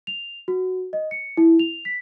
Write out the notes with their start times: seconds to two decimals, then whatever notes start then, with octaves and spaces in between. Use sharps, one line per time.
0.07 F7
0.48 F#4
0.93 D#5
1.11 C#7
1.37 E4
1.59 F7
1.85 B6